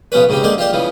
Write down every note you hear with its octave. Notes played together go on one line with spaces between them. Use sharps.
B1 F3 B3 C#4 B4
G#2 C#3 C4 G4
D3 G#3 A#3 C5 D5
F4 G4 C5 D5
C#3 E3 F3